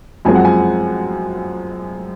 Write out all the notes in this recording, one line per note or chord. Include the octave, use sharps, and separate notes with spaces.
F#2 F3 G#3 C4 G#5
F#5
G#5